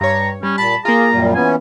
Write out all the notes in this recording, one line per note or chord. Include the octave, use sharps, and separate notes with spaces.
G2 C#5 A#5
G3 C#4
A#2 A5 B5
A#3 F4 G#4 A#5
F#2 A#2 G3
E3 B3 C#4 G#5